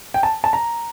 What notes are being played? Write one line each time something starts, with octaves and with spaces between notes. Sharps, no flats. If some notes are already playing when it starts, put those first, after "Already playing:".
G5
A5
A5
A#5